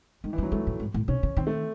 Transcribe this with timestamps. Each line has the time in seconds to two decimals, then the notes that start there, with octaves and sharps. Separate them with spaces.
0.24 D#3 G#3
0.33 E3
0.38 G#3
0.43 F#3
0.52 G#3 A3
0.67 A2
0.80 G#2
0.94 A2
1.08 C3 C#4
1.23 C#3
1.37 D#3 C4
1.47 A3